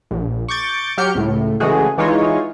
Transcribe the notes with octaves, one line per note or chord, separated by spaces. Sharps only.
A#1
C#6 D6 G6 A6
F#3 G4 F6 G6 C#7
C#2 A2
C#3 E3 G#3 A3 F#4 G#4
E3 G#3 D#4 F4 C#5